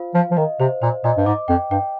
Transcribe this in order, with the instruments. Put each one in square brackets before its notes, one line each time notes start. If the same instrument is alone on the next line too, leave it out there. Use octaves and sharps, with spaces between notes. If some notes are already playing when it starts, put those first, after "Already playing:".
Already playing: [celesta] F4 C5 F5
[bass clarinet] F3 [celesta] F5
[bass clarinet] F3
[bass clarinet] D#3 [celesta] D#5
[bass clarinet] C3 [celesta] C5
[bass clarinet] A#2 [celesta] C5
[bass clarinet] A#2 [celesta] D#5
[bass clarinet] G2
[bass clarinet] G#2 [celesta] D6
[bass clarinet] F2 [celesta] G5
[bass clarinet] G2 [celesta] G5